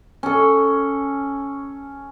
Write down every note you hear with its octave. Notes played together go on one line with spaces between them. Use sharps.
C#4 A4